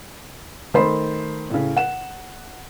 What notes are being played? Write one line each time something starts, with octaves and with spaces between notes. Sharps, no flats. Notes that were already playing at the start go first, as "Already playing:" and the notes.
D#3 A3 C5 B5 C6
A2 C#3
F#5 E7